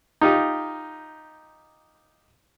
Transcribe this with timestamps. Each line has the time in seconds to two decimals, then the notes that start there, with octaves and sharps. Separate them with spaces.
0.21 D#4 F4 G4